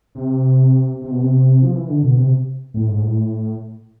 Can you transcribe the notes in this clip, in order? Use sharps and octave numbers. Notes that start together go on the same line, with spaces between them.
C3
C3
B2
C3
F3
E3
D3
B2
C3
A2
G#2
A2